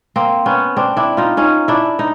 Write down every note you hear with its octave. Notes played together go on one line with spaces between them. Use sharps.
A#3 C4
B3 C#4
C4 D4
D4 E4
D#4 F4
C#4 D#4
D4 E4
D#4